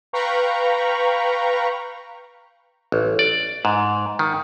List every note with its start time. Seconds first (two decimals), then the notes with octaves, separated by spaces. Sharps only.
0.13 B4 F5 G5 A#5 B5 C#6
2.92 A1
3.19 D5
3.65 G#2
4.19 D#3